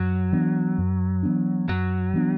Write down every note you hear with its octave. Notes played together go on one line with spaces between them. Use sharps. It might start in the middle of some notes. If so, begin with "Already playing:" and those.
Already playing: F#2 F#3
E3 B3 D4
F#2
E3 B3 D4
F#2 F#3
E3 B3 D4